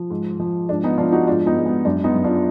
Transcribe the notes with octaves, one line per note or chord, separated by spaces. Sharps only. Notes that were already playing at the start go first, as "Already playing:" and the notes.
Already playing: F3
G#2
F3
G#2 D4
B3 D#4
F3 D4 F4
D#4 F#4
G#2 D4 F4
B3 D#4
G#2
B3
F#2 D4
B3 D#4
F#2
D4 F4